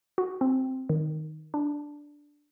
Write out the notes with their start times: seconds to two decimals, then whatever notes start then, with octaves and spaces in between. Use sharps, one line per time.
0.18 F#4
0.41 C4
0.89 D#3
1.54 D4